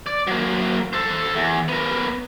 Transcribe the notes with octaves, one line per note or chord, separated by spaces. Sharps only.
D5
F#3 A#3
A4 C5
E2
B3 A#4